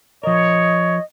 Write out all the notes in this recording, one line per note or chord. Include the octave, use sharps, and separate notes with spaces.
F3 A#4 C#5 D#5